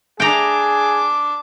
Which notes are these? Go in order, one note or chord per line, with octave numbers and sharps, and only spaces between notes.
D4 G#4 G5 A#5 D6